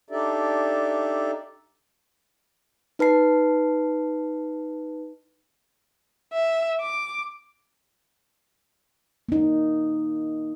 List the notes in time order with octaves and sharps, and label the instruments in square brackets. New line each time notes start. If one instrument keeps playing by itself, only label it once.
[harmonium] D4 D#4 G4 A4 D5 E5
[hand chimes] D#4 B4 A5 C7
[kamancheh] E5
D6
[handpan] A#3 D#4